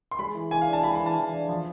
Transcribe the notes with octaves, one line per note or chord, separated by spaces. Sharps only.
C6
G#3 B5
E3
E3 G#5
F5
D4
A5
G#3 B5
B5
E3
A5
E3
D4
F3